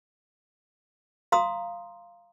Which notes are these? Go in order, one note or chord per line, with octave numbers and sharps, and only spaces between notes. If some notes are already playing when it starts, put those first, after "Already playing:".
F5 A#5 C6 D#6